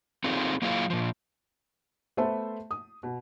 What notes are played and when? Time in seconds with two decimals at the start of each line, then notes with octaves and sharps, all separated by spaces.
0.24 C4 D#4 F4 G#4 A4
0.62 F#3 A#3 E4 F4 G#4 F5
0.90 A#2 F3
2.17 A3 B3 C5 E5 A5
2.71 D#6
3.03 B2